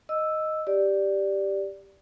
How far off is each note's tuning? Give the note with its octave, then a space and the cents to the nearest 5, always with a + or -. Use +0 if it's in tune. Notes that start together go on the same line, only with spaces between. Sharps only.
D#5 +0 E6 +0
G4 +0 D5 +0